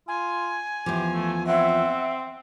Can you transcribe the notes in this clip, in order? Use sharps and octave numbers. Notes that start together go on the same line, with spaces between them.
F4 G#5
E2 F3 G4
A3
C4 E5 F#5